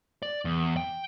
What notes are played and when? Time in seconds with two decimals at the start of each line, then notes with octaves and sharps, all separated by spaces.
0.22 D5
0.45 E2
0.77 G5